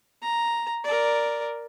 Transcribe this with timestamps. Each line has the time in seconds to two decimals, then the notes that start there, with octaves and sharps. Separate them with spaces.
0.22 A#5
0.84 A#4 D5